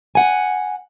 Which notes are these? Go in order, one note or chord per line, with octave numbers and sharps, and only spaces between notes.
F#5 G#5